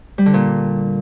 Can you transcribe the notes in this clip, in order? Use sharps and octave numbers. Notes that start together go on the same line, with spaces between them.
G3
D3
A#2